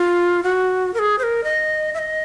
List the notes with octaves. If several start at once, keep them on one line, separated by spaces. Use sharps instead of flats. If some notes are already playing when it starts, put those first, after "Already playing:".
Already playing: F4
F#4
A#4
G#4
C5
A#4
D#5
E5
D#5